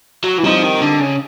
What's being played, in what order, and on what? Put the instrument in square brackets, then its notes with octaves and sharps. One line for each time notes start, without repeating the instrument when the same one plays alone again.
[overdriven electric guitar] F#3
E3
[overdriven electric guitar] F3 [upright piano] G3 C4 D#4
[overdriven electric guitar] D#3
D3
C#3